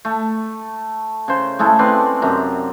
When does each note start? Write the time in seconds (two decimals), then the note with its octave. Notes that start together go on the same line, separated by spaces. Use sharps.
0.05 A3
1.28 C#3 C5
1.59 G#3 A3 E4 A4
1.79 C4 B4 D5 F5
2.22 F#2 C3 A#5